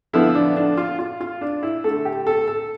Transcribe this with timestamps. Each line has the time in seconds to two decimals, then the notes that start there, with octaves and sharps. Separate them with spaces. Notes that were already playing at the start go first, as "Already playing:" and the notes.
0.13 D3 F3 B3 E4
0.35 D4
0.56 D4
0.77 F4
0.99 F4
1.21 F4
1.41 D4
1.63 E4
1.84 D3 A3 A4
2.05 G4
2.27 A4
2.48 A4